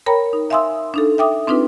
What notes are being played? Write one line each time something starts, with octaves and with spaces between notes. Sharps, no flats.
A#4 C#5 G5 A#5 B5
D#4
E5 F5 G#5 C6 D#6 E6
D4 D#4 A4
E5 G5 D6 D#6
C4 D4 D#4 F4 B4